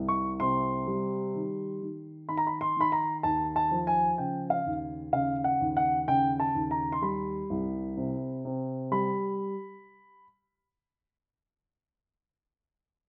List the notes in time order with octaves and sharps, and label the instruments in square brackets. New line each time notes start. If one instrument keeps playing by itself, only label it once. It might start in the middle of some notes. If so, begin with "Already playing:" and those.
Already playing: [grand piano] C2
C#6
C3 C6
G3
D#3
D#3
D#3 B5
A#5
B5
C6
D#3 B5
A#5
D#2 A5
A5
F3
G#5
C#3 G5
F5
D#2
C#3 F5
F#5
D#2
F#5
C#3 G5
A5
D#2
A#5
C6
G3 B5
C2
C3
C3
G3 B5